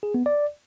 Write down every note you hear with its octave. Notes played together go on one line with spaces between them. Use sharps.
G#4
B3
D5